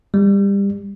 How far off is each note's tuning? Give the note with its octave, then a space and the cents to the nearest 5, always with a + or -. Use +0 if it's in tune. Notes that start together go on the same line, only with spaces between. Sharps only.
G3 +25